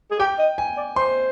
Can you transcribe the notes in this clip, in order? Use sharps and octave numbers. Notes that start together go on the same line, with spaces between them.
G#4
G4 G5
D#5
G#5
D5
C5 C6